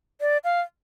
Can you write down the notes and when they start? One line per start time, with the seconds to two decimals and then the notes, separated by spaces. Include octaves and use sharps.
0.21 D5
0.44 F5